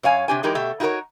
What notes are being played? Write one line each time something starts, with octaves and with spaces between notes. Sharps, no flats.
F#2 C#5 F5 G#5
C3 D4 G4 G#5
E3 G#3 D#4 G4 A#4
B2 A3 G4 E5
D#4 E4 F#4 A4 A#4 C#5